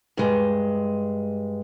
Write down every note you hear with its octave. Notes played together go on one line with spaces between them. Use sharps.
G2 G#3